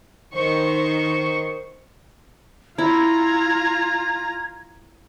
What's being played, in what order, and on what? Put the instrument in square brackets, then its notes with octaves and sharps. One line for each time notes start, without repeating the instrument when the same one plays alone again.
[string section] D#3 C5 C#6
[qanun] E4 [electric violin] F4 A#5 [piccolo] G#6